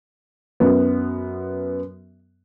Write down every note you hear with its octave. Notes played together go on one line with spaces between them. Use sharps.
F#2 B3